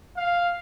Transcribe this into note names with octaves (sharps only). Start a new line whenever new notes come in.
F5